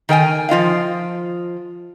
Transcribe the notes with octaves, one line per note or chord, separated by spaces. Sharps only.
D#3 A#4 G5 G#5
F3 F4 D#5 F5